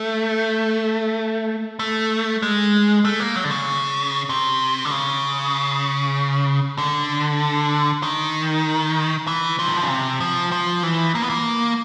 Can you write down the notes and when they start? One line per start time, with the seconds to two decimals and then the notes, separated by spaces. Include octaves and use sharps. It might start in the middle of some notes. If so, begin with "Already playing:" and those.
Already playing: A3
1.79 A3
2.42 G#3
3.05 A3
3.20 A#3
3.36 F#3
3.44 D3
3.51 C#3
4.29 C3
4.85 D3
4.91 C#3
6.78 D3
8.03 D#3
9.27 E3
9.59 F3
9.68 D#3
9.75 D3
9.83 C#3
9.90 C3
10.20 F3
10.52 F3
10.83 E3
11.15 A#3
11.22 B3
11.30 A#3